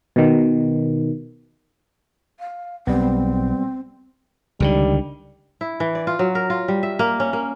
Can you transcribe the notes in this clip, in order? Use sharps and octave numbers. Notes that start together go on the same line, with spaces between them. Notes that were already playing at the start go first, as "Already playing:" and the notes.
B2 D#3
F5
B1 G3 B3 C4
C#2 D3 D#3 G3
E4
E3
D5
F4
F#3
A#4
F4
G3
E5
A#3
C#4
A#3